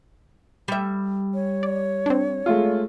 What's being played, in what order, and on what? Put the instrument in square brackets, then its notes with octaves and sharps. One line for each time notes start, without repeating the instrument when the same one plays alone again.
[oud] G3 E5
[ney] C#5
[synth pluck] D5
C4 D4
[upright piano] G#3 A3 F4